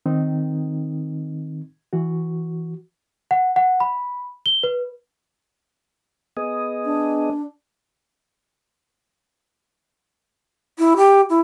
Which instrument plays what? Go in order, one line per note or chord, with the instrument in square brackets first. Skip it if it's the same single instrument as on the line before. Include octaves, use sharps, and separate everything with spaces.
[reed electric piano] D#3 C4 D#4
E3 F#4
[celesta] F#5
F#5
B5
G7
B4
[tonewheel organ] B3 G#4 D#5
[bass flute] D4
[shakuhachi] E4
G4
E4